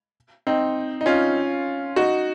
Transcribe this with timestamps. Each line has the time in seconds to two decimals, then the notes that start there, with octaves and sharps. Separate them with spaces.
0.47 C4 D#4
1.01 D#4
1.06 C#4 F4
1.96 D#4 F#4